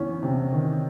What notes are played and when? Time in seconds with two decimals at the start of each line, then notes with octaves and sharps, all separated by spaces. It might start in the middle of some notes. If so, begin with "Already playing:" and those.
Already playing: E2 C#4
0.23 C3
0.53 D#3